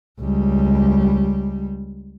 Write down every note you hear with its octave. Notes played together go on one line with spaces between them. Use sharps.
C#2 G3